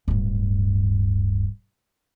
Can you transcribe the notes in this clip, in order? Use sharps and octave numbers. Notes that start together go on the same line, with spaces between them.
D1 G2